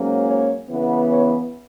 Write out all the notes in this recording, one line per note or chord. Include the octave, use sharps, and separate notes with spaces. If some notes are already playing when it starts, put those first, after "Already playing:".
Already playing: G#2 F#3 A#3 C#4
C#5
C#3 E3 B3
C#5